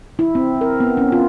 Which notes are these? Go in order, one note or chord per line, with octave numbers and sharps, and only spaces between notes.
E4
C4
A#4
B3
C#4
F4